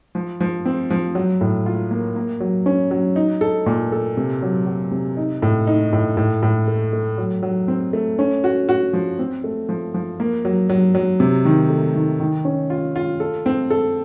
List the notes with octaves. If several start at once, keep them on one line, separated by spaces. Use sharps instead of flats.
F3
F3
C4
F3
F#3
A2
F4
A#3
A#3
F#3
C#4
F#3
D#4
A4
A#2
A4
C3
F#3
F#3
C3
D#4
A2
D#4
A2
A2
A2
A3
A3
F#3
F#3
C4
A3
C#4
F#4
F#4
F3
C4
A3
F3
F3
A#3
F#3
F#3
F#3
C3
D#3
A3
D#3
D#3
C#4
F4
F4
A4
C4
A4